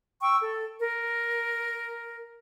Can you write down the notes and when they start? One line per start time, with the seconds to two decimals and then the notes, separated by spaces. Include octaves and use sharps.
0.22 G5 C#6 E6
0.42 A4
0.79 A#4